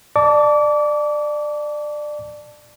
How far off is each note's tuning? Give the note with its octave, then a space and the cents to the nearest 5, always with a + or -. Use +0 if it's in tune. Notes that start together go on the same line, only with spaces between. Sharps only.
D5 +20 A5 +0 D6 -30